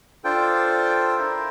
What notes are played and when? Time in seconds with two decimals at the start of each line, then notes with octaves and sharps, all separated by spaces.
0.24 D4 F4 A4 C5 G5
1.18 E4 A#4 E5